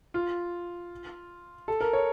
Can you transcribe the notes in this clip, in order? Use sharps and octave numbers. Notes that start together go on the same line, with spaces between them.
F4
A4
A#4
C#5